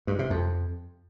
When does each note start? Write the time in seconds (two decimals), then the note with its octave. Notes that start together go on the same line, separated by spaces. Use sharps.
0.07 G2
0.19 C3
0.30 F2